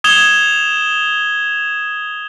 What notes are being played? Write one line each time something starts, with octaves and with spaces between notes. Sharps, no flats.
D#6 G#6 E7 F7 G7